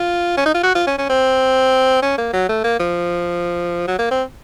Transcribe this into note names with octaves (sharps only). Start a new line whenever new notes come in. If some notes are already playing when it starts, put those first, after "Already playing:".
Already playing: F4
C#4
D#4
F4
F#4
F4
C#4
C#4
C4
C#4
A#3
F#3
A3
A#3
F3
F#3
A#3
C4